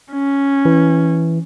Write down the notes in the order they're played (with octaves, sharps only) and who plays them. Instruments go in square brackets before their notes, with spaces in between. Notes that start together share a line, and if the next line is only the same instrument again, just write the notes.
[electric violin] C#4
[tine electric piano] E3